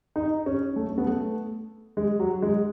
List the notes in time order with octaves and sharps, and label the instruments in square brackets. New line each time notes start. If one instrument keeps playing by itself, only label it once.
[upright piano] D#4
C#4
A3
C#4
B3
A3
G#3
F#3
G#3